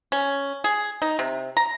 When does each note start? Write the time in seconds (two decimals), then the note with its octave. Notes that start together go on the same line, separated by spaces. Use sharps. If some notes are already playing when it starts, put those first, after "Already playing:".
0.12 C#4
0.64 G#4
1.02 D#4
1.19 C3
1.57 A#5